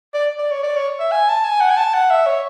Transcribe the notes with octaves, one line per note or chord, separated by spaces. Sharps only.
D5
D5
C#5
D5
C#5
E5
G#5
A5
G#5
F#5
G#5
A5
F#5
E5
C#5